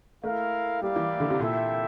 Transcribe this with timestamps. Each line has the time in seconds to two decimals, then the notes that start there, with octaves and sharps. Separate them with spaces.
0.24 A3 E4 A#4 F5
0.82 G3 A#3 E4 G4 D5 F5
0.96 E3
1.20 D3
1.30 C3
1.39 A#2 E4 A4 E5 G5